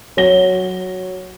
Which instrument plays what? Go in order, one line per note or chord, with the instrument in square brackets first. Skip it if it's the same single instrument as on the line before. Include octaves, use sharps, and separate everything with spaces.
[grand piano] F#3 C#5 A#6 G7